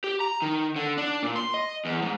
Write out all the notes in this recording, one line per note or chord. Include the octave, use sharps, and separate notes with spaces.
G4
A#5
D#3
D3
D4
A#2
C6
D#5
E2
G#2